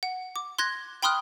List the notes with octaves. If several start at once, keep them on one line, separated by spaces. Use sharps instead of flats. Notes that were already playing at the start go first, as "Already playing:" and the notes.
F#5
D6
C6 F#6 G#6 A#6
G5 B5 C6 D#6 F6 F#6